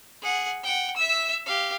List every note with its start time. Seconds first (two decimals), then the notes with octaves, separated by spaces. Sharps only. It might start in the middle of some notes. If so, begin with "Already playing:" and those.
0.22 G#4 F#5
0.64 F#5 G5
0.96 E5 E6
1.46 G4 F5